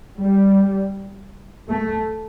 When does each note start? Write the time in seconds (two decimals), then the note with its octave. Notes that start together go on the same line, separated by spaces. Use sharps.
0.19 G3
1.68 A3